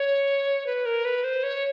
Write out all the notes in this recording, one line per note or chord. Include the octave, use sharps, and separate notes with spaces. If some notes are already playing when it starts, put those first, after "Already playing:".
Already playing: C#5
B4
A#4
B4
C5
C#5